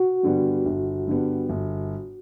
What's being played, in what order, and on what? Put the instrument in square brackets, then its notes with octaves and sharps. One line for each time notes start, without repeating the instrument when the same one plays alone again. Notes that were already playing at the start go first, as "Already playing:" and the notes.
Already playing: [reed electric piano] F#4
[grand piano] G2 D3 G3 B3
G1
G2 D3 G3 B3
G1